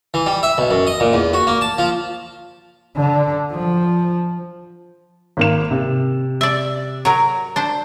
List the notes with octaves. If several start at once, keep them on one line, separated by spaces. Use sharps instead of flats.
E3
G3
E5
B1
F#2
D#5
A#2
E2
F#4
A#3
A5
F3
D3
F3
G#1 A#3 E7
C3
D5 E5
F#3 A#4
D4 C5